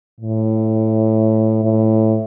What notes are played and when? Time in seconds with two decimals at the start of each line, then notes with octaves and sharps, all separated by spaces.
0.21 A2
1.64 A2